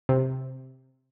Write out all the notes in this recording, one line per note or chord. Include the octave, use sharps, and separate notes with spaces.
C3